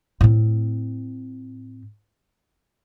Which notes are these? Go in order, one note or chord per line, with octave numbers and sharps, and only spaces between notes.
A2 C4